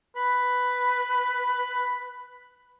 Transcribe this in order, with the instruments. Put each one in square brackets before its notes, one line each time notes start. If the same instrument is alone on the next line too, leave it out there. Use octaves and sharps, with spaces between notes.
[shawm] B4 [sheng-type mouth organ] B5